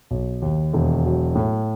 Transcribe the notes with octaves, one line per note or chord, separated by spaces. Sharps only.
B1
D#2
E1
F#3
A2